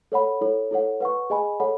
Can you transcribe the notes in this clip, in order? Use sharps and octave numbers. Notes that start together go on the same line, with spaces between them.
A4 C#5 F#5 B5
E4 A4 C#5
E4 A4 C#5 F#5
B4 F#5 C#6
G#4 D#5 G#5 B5
A4 C#5 F#5 B5